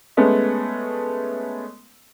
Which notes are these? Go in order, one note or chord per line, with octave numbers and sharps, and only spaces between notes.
G#3 A3 B3 C#4